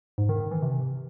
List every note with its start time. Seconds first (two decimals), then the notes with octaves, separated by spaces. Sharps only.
0.18 G#2
0.29 D#3
0.40 D#3
0.51 E3
0.62 C3